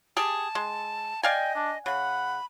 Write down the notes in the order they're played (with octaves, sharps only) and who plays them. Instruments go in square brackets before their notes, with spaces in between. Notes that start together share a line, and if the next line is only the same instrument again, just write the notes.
[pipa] G4 G#4 [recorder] A5
[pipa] G#3
[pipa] D5 F5 G#5 [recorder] D#5 [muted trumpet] G5
[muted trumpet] D4
[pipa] C#3 [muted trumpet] F#5 [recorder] B5